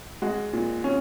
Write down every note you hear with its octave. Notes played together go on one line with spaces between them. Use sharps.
G#3 F#4
A#2
C#4